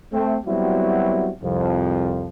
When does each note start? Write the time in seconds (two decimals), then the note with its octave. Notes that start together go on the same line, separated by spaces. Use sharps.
0.13 A3 C4
0.46 F#3 G3 B3 C4 E4 F#4
1.42 C2 F2 F3